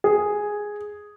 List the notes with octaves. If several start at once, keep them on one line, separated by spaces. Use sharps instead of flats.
G#4